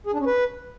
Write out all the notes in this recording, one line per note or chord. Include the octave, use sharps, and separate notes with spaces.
G#4
D4
C#4
B4